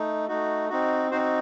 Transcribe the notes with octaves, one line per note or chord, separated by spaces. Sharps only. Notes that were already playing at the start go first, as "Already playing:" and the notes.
Already playing: A3 D#4
A3 D#4 F#4
C4 D#4 F#4
C4 D#4 F#4 C5